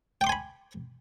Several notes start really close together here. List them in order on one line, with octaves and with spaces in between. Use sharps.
G5 D6 C6 G#5 B5